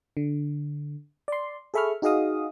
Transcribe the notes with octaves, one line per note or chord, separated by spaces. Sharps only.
D3
D5 C6
G#4 A4 E5 B5 C#6 F6
D#4 F#4 G#4 D#5 F5 D#6